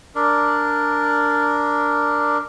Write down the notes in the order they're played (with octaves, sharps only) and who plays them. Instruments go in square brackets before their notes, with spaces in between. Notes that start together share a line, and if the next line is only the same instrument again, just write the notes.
[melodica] D4 A#4 D5